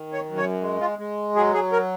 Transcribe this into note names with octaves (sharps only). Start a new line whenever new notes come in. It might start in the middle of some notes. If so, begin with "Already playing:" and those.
Already playing: D#3
C#5
F#2
C#5
G#3
F4
G#3
F#3 G#4
G#4
A#4